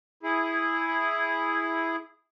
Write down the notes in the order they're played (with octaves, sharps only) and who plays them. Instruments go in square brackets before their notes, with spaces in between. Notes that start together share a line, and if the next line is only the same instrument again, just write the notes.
[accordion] E4 G#4